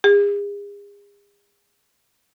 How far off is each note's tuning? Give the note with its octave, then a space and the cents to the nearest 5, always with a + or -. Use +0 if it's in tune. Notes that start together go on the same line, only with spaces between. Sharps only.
G#4 -40